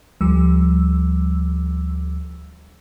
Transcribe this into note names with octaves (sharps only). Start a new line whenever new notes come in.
D2 F3 G3 E6